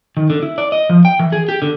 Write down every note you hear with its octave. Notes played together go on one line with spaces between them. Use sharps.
D#3
D3
E4
D5
D#5
F3
G5
E3
G#4
G4
D3